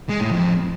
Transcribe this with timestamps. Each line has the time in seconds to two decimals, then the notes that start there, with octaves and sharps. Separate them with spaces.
0.09 G#3
0.20 A2
0.31 F2